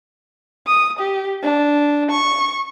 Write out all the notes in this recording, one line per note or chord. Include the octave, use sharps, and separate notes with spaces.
D#6
G4
D4
C#6